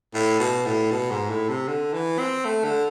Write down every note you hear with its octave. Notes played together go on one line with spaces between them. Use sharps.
A2
B2
A2
B2
G#2
A2
C3
D3
E3
C4
A3
D3